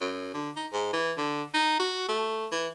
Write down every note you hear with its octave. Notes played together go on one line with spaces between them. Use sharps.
F#2
D3
D#4
G#2
E3
D3
D#4
F#4
A3
E3